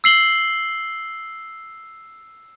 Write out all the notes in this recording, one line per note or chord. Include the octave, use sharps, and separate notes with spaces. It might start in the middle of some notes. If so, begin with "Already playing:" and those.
E6 C7 F#7 G7